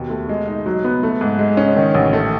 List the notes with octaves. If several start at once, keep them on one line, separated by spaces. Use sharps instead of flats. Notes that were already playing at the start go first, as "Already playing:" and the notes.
Already playing: D#2 B2
A3
G#3
D#4
F#3
B3
A3
G#2
G#3
C#4
D#3
A1
A3